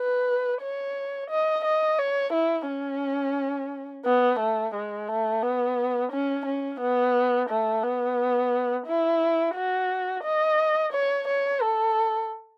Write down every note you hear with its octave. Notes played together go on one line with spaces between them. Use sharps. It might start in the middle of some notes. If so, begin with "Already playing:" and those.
Already playing: B4
C#5
D#5
D#5
C#5
E4
C#4
B3
A3
G#3
A3
B3
C#4
C#4
B3
A3
B3
E4
F#4
D#5
C#5
C#5
A4